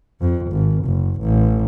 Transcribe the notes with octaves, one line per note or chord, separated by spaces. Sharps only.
F2
G#1
F#1
A1